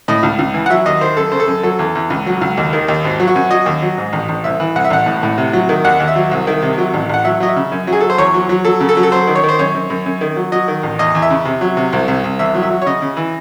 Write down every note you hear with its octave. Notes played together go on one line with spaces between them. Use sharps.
A2 D#5
C#2
C#2
E3
F#5
F#3 E5
D#2 D#5
D#3 C5
F#2 A4
C#3 C5
A4
F#2
F#3 A4
E2
E2
C#2
F#3
C#2
D#2
D#3
D#2
G#1
F#3
F#4
F#2
F#3 D#5
D#2
F#3
G#2
A1
A1
C2 E5
E3
C2 F#5
E5
A1 F#5
A2
A2
C3
F#3
D#3
D#2 F#5
D#2
E5
F#3
C2
D#3
C3
F#3
A1
A1 F#5
F#3 E5
F#3 D#5
E5
C#3
F#2
F#3
G#4
F#3 A4
C5
E2 C#5
F#3
F#3
F#3 A4
C#3
A4
F#3
A4
F#3 C5
D#3
C#5
D#3
C5
F#2 C#5
F#2
F#2
F#2
D#3
F#3
F#3 D#5
D#3
A1
E2 D#5
E2
E5
C#3
C3
F#3
C3
C2
C2
C2
E2 E5
F#3
E5
F#3
C#5
C#3 D#5
C#3
E3